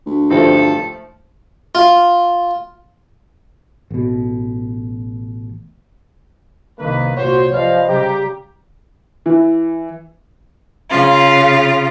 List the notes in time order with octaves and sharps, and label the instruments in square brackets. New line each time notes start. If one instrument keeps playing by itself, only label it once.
[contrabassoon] D2
[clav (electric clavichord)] G1 G2 C4 [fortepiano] D#3 F3 A3 [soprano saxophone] A4
[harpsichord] F4
[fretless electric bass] A1 B2
[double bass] C2 D#3 [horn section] A#3 B4
[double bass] C2 A#2 [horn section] F#4 C5 [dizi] C#5
[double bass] F3 [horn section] G3 B4 F5 [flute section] C5 D#5 [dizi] D5
[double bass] C#3 G3 [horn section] G4 [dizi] A#5
[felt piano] E3
[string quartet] C#3 F4